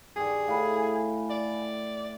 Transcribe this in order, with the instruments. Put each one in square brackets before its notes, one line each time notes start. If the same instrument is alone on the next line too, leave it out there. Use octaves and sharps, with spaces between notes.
[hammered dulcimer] G2 D#3 [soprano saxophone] G#4
[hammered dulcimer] A2 [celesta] F5 G#5 B5
[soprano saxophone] D5